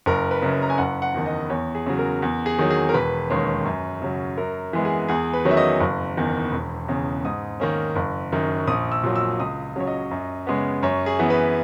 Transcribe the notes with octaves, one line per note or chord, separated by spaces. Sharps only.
F#1 A#4
B4
F#2 C#3
A#5
G#5
F#1 F#5
F#5
E2 D#3
D#5
E2 C#5
G#4
C#3 F#3
A#4
E2
G#4
D#3 F#3
G#4
A#4
E1 B4
D#2 D#3 G#3 C#4
F#2
C#3 F#3
F#2 A#4
E3 G#3 B3
G#4
E2 G#4
B4
D#3 F#3 C#4
E5
D#5
F#1
E2 D#3
E1
E2 C#3
G#2 D#6
D#3 A#3 C#4
F#1
F#2 D#3
A#1 D#6
E6
A#2 F#3
E6
C#2 D#6
C#3 F#3 C#4 C#5
D#5
F#2
C#3 G#3 B3
F#2 C#5
G#4
E3 B3
B4